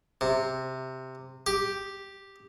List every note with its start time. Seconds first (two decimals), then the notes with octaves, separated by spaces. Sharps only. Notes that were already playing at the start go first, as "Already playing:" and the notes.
0.21 C3
1.47 G4